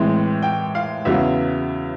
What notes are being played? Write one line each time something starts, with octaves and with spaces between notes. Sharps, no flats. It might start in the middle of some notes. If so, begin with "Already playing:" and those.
Already playing: A2 E3 G#3 C4
G5
F5
E2 C#3 F#3 B3 E5